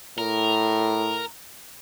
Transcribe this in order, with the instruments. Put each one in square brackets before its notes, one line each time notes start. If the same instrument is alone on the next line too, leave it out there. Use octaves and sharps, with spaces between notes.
[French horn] A2 [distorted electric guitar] A#4